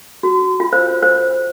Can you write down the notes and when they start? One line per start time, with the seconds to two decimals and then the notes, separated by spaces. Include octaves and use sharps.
0.23 F#4
0.60 F4
0.73 C5
1.03 C5